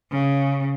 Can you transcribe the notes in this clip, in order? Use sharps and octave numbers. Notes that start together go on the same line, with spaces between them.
C#3